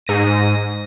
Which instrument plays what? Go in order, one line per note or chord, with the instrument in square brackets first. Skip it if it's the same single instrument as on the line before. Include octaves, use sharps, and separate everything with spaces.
[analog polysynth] G#2 A#6 D#7